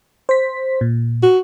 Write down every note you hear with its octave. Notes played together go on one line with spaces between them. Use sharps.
C5 B6
A#2
F#4